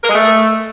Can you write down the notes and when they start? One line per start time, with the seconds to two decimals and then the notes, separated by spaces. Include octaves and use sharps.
0.04 A#4
0.09 G#3
0.15 A3